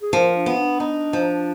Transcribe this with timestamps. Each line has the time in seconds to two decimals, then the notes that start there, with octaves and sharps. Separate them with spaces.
0.02 G#4
0.13 F3 A#4
0.36 D4
0.46 B3
0.58 D4
0.80 D#4
1.13 F3